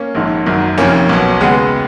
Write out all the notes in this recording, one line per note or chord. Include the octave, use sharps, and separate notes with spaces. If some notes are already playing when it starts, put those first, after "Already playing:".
Already playing: A#3 C#4
A#1 G#2 D#3
G#1 F#2 D#3
F1 F2 D#3 A#3 C#4
B1 B2
D#2 C#3 G#3 B3